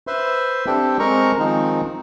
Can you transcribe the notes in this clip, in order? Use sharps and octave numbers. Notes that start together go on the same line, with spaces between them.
B4 C5 E5 C6
C4 D4 G4 A4 G5
G#3 C4 A#4 A#5 C#6
D#3 F3 G#3 C4 D#4